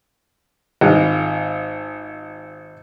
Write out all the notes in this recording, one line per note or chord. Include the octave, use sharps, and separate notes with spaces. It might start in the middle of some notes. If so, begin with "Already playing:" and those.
G#1 F4